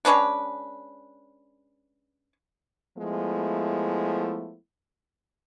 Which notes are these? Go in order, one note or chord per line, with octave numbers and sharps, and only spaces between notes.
G#3 C#4 D4 B4
F3 G#3 A3 B3 E4